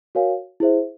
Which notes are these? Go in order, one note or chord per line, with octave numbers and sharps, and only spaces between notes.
F#4 A#4 C#5 F5 G#5
E4 G#4 C5 E5